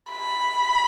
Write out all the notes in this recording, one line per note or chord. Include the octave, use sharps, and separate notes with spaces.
B5